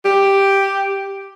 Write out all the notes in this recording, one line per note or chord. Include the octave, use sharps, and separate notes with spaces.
G4